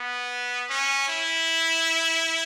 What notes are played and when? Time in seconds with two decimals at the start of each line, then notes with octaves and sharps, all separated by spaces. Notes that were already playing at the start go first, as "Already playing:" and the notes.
Already playing: B3
0.70 C#4
1.08 E4